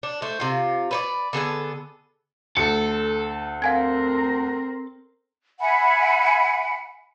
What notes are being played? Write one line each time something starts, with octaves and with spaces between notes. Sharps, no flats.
D4
A3 C5
C3 F4
B4 C#5 D5
D3 B3 G#4 A4
D2 A4 C#7
C4 A#4 F5 G#5 G#6
E5 F#5 G#5 B5